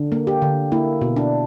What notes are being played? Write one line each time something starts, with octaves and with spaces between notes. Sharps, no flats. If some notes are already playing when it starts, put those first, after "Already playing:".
Already playing: D3
A#3
G4
D3
A#3 E4
B2
D4